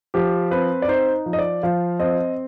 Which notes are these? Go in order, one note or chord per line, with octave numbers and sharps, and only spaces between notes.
F3 G4
C4 B4
D5
D#4 C5
F3
D#5
D5
F3 F5
C4 D#5